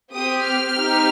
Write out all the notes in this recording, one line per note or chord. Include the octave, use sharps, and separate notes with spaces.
C4 G4 D#6
F6
C4 D#4 G4